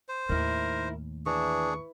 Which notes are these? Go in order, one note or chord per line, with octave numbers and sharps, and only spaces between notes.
C5
D#2 A2 D#3 E4 A#4
E3 D4 G#4 C#6